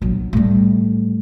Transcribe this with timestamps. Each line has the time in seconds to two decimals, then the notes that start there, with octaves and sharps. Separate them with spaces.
0.02 A#1 F#3
0.33 A2 G3